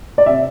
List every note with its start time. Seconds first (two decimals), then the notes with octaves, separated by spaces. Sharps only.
0.18 D5
0.26 C3 E5